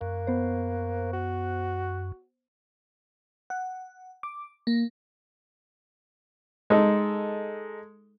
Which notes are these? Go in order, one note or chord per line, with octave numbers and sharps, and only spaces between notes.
F#2 A#3
B3 C5
F#4
F#5
D6
A#3
G#3 D#4 A4